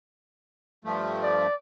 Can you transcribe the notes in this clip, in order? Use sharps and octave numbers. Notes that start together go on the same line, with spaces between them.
G2 F3 A3
D5